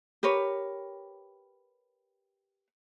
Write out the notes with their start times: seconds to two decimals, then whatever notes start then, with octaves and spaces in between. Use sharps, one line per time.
0.23 G4 A#4 B4 C#5